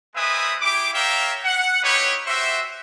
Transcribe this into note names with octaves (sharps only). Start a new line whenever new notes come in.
G#3 C4 B4 E5 G#5 D#6
E4 G4 G#4 D6
A#4 C#5 E5 F5 G5
F#5
D#4 E4 G4 B4 C#5
F#4 G4 C5 E5